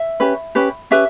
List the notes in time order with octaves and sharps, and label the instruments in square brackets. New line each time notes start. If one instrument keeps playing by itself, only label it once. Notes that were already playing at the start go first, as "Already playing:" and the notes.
Already playing: [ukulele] E5
C#4 G4 B4
C#4 G4 B4
C#4 G4 B4 E5